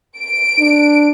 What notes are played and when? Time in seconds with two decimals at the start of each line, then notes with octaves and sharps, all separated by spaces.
0.18 D7
0.59 D4